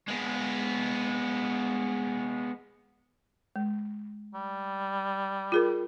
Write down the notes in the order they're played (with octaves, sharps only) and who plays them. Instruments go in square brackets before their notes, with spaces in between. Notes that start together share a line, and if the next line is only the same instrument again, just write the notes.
[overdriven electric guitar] G#3 B3
[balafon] G#3
[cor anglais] G3
[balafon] F4 G#4 A#4